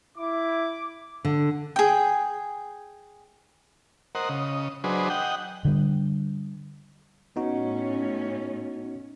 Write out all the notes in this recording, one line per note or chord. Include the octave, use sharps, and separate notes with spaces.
E4 D6
D3
G#4 G5
A#4 C5 D#5 F#5
C#3 D#5
F#3 D4 G#4 B4 C5 D#5
D#5 F#5 G5
D3 G3
A2 B3 C#4 D#4 F#4